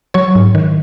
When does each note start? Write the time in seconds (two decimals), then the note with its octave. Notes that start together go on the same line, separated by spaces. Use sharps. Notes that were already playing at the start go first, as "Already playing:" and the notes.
0.14 F#3 C#5 C#6
0.35 G#2
0.55 D#3